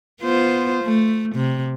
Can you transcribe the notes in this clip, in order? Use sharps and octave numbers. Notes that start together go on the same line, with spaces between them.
B3 F4 C5
A3
C3